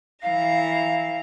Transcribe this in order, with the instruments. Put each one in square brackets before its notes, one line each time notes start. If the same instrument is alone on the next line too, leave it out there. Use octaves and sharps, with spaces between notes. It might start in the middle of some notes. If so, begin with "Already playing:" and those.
[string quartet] E3 A#5 [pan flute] F5